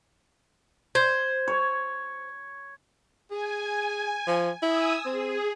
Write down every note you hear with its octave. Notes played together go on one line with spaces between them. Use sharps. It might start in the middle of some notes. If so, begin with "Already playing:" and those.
C5 G#6
C#5
G#4 G#5
F3
E4 G#5 D#6 E6
C4 G#4